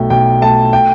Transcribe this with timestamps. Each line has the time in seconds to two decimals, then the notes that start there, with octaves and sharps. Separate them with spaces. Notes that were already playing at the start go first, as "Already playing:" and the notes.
Already playing: B1 A3 G5
0.10 B1 G5
0.41 A3 A5
0.73 G5